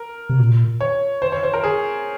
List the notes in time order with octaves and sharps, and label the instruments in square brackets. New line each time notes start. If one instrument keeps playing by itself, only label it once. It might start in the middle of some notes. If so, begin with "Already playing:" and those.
Already playing: [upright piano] A#4
[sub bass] C3
A#2
[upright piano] C#5
C5
C#5
C5
A#4
G#4